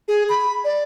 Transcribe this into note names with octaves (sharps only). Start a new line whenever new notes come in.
G#4
B5
D5